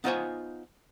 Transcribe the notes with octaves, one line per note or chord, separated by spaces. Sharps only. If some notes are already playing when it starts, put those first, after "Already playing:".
B3 D#4 F4 C5 C#5 G#5